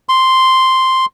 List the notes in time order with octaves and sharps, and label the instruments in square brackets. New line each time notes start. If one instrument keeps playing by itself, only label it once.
[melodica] C6